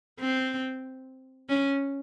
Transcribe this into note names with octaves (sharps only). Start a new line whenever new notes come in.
C4
C#4